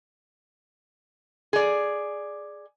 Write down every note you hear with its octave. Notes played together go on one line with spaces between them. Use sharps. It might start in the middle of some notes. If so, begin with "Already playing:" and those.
G#4 D5